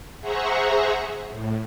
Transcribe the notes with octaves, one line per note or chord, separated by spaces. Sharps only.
G#4 C5 E5 F#5 A#5 C#6
A2